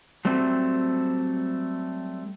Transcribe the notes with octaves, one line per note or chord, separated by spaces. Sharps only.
F#3 G3 A3 C4